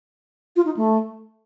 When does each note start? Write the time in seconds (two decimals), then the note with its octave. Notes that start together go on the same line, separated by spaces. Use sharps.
0.56 F4
0.66 D#4
0.77 A3